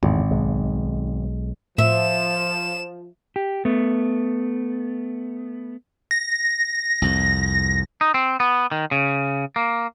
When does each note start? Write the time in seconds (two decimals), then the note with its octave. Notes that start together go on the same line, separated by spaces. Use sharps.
0.03 G#1 E2 A2 C#3
0.31 B1 G#3
1.78 A2 F3 E5 E7
3.36 G4
3.65 A3 B3
6.11 A#6
7.02 C2 F2
8.01 D#4
8.14 C4
8.40 B3
8.72 D#3
8.91 C#3
9.56 A#3